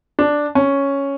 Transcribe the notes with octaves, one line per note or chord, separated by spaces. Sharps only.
D4
C#4